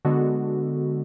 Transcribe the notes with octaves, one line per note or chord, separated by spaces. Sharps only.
D3 G#3 B3 F#4 A4